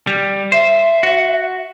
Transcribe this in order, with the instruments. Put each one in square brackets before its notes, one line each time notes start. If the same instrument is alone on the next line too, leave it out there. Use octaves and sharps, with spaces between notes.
[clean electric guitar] G3
[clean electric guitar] C5 [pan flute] E5
[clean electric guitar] F#4